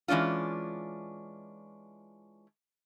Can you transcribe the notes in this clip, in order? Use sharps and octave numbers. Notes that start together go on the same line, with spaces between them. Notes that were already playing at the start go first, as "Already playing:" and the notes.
E3 G#3 C#4 D4 F4